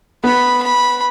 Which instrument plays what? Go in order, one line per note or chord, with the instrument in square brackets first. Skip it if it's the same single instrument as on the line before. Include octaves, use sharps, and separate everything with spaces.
[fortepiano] B3 B4 [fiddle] B5
[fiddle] B5